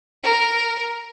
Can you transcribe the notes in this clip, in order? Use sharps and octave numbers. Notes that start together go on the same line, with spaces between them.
A#4